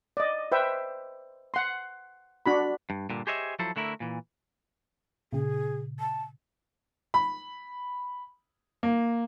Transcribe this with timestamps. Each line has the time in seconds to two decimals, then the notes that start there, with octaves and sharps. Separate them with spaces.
0.17 D5 D#5
0.52 B4 C5 E5 G5
1.54 F#5 C6
2.46 D4 F#4 B5
2.90 G2
3.10 G2 A#2 D3
3.27 G4 G#4 C5 C#5 D#5 E5
3.59 F3 F#3 E4 A4 C5
3.76 D3 A3 E4 A#4
4.00 A#2 E3
5.33 A#2 C#3 G#4
6.00 A5
7.14 B5
8.83 A#3